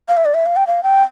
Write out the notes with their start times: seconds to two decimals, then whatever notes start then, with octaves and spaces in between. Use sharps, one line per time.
0.09 F5
0.17 E5
0.25 D5
0.34 E5
0.46 F5
0.56 G5
0.67 F5
0.83 G5